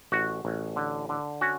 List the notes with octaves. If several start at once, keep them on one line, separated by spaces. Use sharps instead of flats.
A1 F#4
A1
D3
D3
C#4 F#4